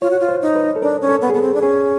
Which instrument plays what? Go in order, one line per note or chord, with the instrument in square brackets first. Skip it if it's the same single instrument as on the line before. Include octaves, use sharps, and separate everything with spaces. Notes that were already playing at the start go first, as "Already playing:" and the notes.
[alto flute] F4 [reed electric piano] C#5
[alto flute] F#4
F4
[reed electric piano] C5
[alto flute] D#4
[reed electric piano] B4
A4
[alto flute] D4 [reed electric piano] A#4
[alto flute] C#4
[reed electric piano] A4
[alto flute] B3
[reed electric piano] G#4
[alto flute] B3 [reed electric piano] A4
[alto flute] C4
D4
[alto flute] C#4 [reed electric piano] G#4